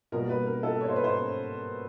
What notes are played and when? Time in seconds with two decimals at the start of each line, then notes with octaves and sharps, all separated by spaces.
0.12 B2 G3 A#3 A#4
0.29 B4
0.46 A#4
0.63 A4
0.81 C#5
0.88 C5
0.96 B4
1.04 C5